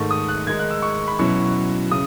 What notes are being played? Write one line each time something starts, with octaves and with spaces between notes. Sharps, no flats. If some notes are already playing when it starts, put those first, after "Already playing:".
Already playing: G#2 D#3 A3 C#6
D#6
F#6
D#3 G#3 D#4 G#6
F#6
E6
C#6
B5
B2 F#3 C#4 E4 C#6
C#3 D#6